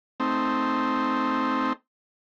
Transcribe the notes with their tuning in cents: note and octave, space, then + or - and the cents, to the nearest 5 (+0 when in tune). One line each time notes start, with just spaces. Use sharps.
A3 +0 C4 +0 D#4 +5